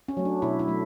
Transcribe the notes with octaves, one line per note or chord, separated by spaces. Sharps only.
C#4
F#3 A3
D4
B2 E4
E4
F#3 A3